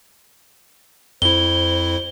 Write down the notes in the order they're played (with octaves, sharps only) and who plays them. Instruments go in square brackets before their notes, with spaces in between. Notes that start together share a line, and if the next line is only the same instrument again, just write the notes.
[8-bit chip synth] F2 E4 [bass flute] C5 [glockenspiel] G7